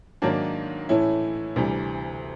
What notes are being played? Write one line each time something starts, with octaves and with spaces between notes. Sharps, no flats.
G#2 D#3 F#3 A#3 D4
A2 E3 A3 C#4 E4
D2 C3 E3 G3